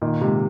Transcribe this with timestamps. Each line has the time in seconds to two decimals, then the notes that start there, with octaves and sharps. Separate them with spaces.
0.02 A#2 D#3
0.21 G#2 C3